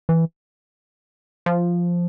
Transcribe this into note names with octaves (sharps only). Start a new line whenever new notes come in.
E3
F3